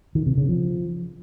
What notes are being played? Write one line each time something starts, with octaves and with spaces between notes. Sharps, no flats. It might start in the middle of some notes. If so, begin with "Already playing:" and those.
D#3
C3
C#3
F3